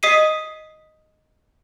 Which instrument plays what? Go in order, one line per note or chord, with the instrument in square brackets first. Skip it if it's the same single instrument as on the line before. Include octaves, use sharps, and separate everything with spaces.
[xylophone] D#5 D#6 B6 C7 D#7